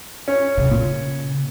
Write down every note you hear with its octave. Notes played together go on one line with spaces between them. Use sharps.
C#4
C#3
A#2